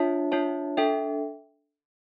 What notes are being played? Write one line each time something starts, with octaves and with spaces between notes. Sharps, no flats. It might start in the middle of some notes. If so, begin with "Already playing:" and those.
Already playing: D4 F4 C#5 E5 A5
D4 F4 C#5 E5 A5
D4 A4 E5 G5